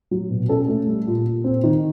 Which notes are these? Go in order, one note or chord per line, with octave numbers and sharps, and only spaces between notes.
F#3
B2
C#4 A4
A3
G3
A#2
A#2
C4
D#3